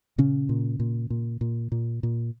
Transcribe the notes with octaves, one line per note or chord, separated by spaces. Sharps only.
A#2 C#3 C#4
A#2
A#2
A#2
A#2
A#2
A#2